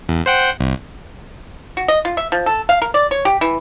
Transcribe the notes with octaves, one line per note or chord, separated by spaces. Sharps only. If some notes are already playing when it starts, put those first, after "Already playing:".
E2
C5 F#5 G5
C2
F#4
D#5
F4
E5
F3
A4
F5
A#4
D5
C#5
G4
E3